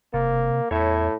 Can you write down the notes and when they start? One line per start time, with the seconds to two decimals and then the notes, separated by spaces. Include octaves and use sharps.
0.14 E1 C3 A#3
0.71 E2 A2 C#5 E5